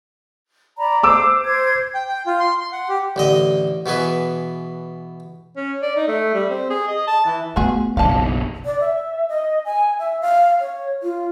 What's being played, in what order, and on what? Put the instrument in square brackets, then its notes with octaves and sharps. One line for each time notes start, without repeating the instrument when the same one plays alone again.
[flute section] D5 A#5 B5
[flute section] C5 [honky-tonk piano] D6 E6
[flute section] C5 G#6
[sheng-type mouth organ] G5
G5
F4
C6
C6
F#5
G4
[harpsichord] A1 D3 D#5
B2 E3 G#4 B4
[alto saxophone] C#4
D5
D#4
A3
G3
C4
G#4
D#5
A5
E3
[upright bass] A3 B3 [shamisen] F4 F#4 G#4
[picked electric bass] F#1 B1 [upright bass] F3 D#4 [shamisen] F5 A5
[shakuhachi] D5
E5
D#5
G#5
E5
F5
C#5
F4